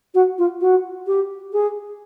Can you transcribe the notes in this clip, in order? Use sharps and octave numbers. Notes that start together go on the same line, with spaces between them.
F#4
F4
F#4
G4
G#4